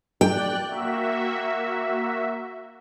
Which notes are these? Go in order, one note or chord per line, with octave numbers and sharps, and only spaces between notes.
D5 G5 F#6
A#3 F#4 E5